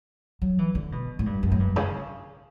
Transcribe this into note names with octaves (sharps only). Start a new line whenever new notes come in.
F#3
E3
D3
B2
A2
G2
F#2
A2
G2
C#3